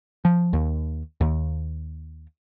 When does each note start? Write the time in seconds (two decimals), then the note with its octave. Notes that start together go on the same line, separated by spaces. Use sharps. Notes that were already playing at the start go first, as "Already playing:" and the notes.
0.25 F3
0.53 D#2
1.21 D#2